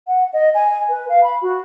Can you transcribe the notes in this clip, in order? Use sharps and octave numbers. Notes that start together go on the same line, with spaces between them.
F#5
D#5
G#5
B4
F5
B5
F#4